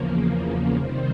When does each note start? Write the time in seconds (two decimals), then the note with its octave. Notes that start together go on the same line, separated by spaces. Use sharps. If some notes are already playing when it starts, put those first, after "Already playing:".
Already playing: E2 C#3 F3 A#3
0.77 C3 D#3 G3 C4